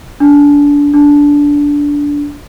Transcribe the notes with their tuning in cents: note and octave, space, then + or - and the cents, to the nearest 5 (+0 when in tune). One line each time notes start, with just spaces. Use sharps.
D4 -25
D4 -15